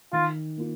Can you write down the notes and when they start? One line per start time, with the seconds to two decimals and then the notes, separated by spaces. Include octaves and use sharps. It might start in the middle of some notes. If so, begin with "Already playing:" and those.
0.12 D#3 F4
0.57 A#3 F4